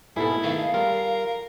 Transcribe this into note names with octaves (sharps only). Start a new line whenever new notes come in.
G#2 B2 B3 E4 G#4 A4
D#3 A3 B3 F5
G3 F4 A#4